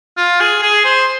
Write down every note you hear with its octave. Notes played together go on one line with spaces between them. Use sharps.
F4
G#4
G#4
C5